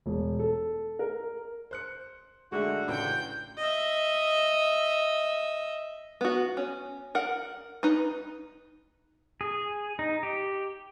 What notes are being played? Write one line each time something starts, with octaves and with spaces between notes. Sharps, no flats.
E1
A4
A#4
C5 F#6 C#7
F#2 D3 G#3 A3 F#4
A1 C#3 G5 G6
D#5 E5
B3 F#4
C#4
A#4 F#5
D#4 B4
G#4
D#4
G4